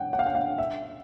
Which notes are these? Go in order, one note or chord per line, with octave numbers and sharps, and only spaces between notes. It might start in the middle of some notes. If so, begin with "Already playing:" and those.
Already playing: F#5 G5
F#5
F5
F#5
F5
E5